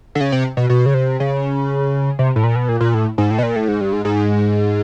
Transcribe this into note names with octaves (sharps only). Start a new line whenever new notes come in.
D3
C#3
C3
B2
B2
C#3
C3
C#3
C3
A2
A#2
B2
A#2
A#2
A2
G#2
A2
B2
A#2
A2
G#2
G2
G#2
G#2